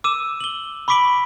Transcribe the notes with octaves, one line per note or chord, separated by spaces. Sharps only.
D6 E6 D#7 E7
F#7 G7
B5 C#6 D6 B6 D7 F#7